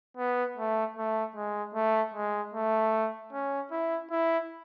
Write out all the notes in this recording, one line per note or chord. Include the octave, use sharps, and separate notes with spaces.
B3
A3
A3
G#3
A3
G#3
A3
C#4
E4
E4